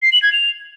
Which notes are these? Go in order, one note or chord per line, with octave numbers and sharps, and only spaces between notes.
C7
F#7
G#6
F7